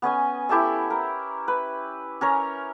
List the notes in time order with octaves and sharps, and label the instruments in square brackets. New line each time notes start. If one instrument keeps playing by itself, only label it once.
[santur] B3 C#4 D#5 G#5
E4 G4 A4 E5
A#4
B4
C#4 A#4 C#5